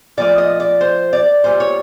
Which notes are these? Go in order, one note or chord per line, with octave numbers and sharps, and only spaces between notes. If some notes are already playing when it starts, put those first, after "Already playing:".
A#2 F3 A3 D5
D#5
D5
C5
D5
A#2 G3 C5
C#5